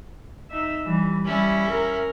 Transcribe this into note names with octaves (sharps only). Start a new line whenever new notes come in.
D#4 E5
E3 G3
G3 C#4 E4
A#4